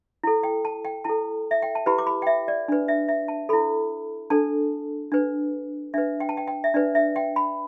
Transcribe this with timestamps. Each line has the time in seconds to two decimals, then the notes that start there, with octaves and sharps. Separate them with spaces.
0.23 E4 A4
0.43 G5
0.65 A5
0.85 G5
1.04 E4 A4 A5
1.51 E5
1.62 G5
1.75 A5
1.86 E4 G4 B4 B5
1.98 D6
2.07 B5
2.22 G5
2.27 E5
2.48 D5
2.68 D4 B4
2.88 E5
3.08 E5
3.28 A5
3.49 E4 A4 B5
4.30 D4 A4 A5
5.12 D4 B4
5.94 D4 B4 E5
6.20 G5
6.29 A5
6.37 G5
6.47 G5
6.64 E5
6.74 D4 B4 D5
6.95 E5
7.16 G5
7.36 B5